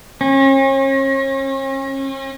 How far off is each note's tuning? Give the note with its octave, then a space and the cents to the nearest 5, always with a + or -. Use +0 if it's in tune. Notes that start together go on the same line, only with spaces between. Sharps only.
C#4 -40